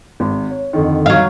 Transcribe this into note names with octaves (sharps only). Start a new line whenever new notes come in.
G#1
C#5
F2 D3 D#3
F#3 F5